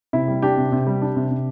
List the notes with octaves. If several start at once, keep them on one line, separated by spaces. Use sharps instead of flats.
C3 E4
G3
D4 G4
C3
C3
G3
D4
C3
C3